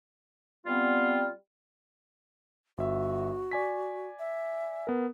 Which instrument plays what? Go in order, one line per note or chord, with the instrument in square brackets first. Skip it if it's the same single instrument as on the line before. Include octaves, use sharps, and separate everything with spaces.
[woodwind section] G3 B3 C4 F4
[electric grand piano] G1 E5 [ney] F#4
[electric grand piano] D5 G#5 B6
[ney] E5
[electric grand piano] B3 A#4